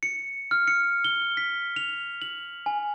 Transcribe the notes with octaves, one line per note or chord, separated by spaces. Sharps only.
C#7
F6
C#7
G7
B6
F7
F#7
G#5